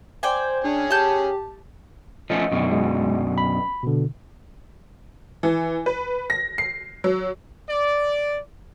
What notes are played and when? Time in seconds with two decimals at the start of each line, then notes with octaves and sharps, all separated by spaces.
0.23 C5 D5 G5 G#5
0.64 C#4 D4 G#4 C#5
0.90 G4 A5 G6
2.30 F3 A3 C#4 D#5
2.52 F#2 B2 D3
2.71 F#3 G#3
3.38 B5
3.83 B2 D3
5.43 E3
5.86 B4
6.30 A#6
6.58 C7
7.04 F#3
7.68 D5